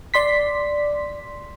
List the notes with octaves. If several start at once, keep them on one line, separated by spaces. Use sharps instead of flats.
D5 C6 B6